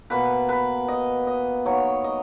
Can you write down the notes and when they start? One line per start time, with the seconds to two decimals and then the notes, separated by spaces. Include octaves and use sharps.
0.10 B2 A#3 B4
0.49 B4
0.88 D#5
1.27 D#5
1.65 D#3 F#3 A#3 C#5
2.04 D#5